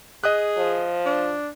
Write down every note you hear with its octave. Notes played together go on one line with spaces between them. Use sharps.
G#4 D#5 D#6 F#6
F3
D4